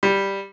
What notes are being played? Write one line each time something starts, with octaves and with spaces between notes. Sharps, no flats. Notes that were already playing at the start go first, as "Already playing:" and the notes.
G3